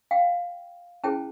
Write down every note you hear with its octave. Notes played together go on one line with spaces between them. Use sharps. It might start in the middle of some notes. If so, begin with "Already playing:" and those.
F5 G5
C#4 E4 G#4 C5 G5 A5